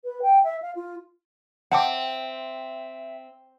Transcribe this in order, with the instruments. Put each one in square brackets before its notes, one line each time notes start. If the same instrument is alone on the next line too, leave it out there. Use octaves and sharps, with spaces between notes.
[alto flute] B4
G5
E5
F5
F4
[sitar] C4 [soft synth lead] E5 [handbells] F#5 A5 D6